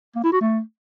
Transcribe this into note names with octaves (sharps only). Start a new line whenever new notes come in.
A#3
E4
F#4
A3